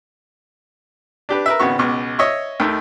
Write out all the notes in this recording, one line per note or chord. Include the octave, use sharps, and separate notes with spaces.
D4 G4 B4
A#4 B4 E5
G#1 C#3 B3 F#4 C#6
C#2 B2 C#6 D6
C#5 D#5 E5 C#6
D#2 D#3 A3